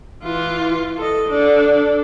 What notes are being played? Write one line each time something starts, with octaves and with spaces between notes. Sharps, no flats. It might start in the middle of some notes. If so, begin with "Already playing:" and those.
E3 F4
A4 D#5
D4 A4